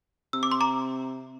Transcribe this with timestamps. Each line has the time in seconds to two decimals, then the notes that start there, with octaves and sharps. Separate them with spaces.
0.33 C3 E6
0.43 D6
0.52 C6
0.61 A#5 D6